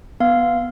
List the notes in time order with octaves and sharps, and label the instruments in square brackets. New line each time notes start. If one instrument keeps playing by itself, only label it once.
[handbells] B3 F5